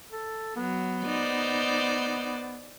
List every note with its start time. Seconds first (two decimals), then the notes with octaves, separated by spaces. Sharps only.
0.12 A4
0.56 F#3 B3
1.06 D#4 C5 D5